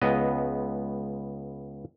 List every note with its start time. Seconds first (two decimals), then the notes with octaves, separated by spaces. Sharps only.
0.02 C#2 B3 D#5